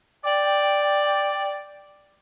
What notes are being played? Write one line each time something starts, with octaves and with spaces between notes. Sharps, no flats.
D5 G5